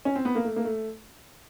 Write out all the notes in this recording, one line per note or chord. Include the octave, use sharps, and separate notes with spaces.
C#4
C4
B3
A#3
A3
A#3
A3